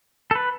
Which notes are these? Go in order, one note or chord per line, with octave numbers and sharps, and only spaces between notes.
A4
B4